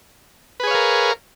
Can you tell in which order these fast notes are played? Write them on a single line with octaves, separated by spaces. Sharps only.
B4 G#4 C#5 F5 A#4